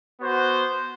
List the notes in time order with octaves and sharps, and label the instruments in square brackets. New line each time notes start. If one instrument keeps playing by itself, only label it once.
[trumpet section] B3 F#4 C5